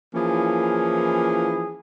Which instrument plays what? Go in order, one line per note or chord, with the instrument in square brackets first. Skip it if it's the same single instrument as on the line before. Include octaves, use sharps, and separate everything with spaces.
[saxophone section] E3 F3 A#3 C#4 E4 G#4